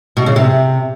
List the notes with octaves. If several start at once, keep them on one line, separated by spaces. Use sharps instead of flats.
B2
C#3
C3